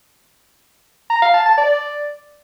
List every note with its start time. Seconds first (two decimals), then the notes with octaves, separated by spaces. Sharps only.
1.10 A#5
1.22 F5
1.34 A5
1.46 A5
1.57 D5